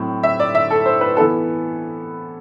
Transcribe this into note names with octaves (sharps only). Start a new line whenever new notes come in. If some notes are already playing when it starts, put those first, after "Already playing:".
Already playing: A2 F#3 C4
E5
D5
E5
A4
C5
B4
E3 B3 A4